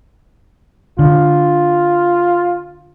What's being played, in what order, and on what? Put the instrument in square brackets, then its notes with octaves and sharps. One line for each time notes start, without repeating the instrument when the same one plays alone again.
[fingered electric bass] D3 [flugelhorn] F4